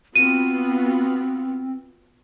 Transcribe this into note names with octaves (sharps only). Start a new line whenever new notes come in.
B3 C4 F4 F#4 D#7